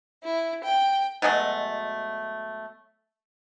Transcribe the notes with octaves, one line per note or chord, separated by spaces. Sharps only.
E4
G5
B2 F#3 G#3 A3